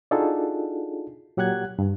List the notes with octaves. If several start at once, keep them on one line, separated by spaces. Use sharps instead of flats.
D4 D#4 F4 F#4 G#4 A4
A#2 F#3 G4 F#5 F#6 G#6
G2